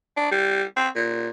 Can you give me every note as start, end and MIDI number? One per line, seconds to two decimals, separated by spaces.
0.17 0.31 62
0.32 0.64 55
0.77 0.89 60
0.96 1.29 46